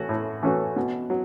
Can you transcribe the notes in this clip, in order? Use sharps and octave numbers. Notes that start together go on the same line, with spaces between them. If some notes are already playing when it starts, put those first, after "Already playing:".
Already playing: E3 A3 C#4 F#4
A2
E3 A3 C#4 F#4
B2
F#3